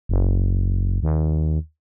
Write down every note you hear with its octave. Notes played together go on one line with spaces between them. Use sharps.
F#1
D#2